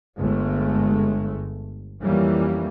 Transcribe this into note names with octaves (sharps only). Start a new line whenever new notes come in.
G1 G#3 A3
F2 E3 G3 A#3 C#4